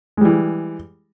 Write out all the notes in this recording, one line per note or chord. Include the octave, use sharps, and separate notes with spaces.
E3 G3 G#3